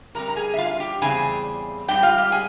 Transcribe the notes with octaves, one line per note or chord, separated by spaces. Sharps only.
G2 G3 C4 A#4 A#5
A#5
G#4 G#5
E5
F4 F5
G4 G5
E2 C#3 G3 C4 G#4 G#5
G#2 G3 C4 G4 G5
F4 F5
G4 G5
G#4 G#5